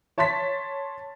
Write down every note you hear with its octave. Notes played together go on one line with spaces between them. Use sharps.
C#5 A5 C6 A6 B6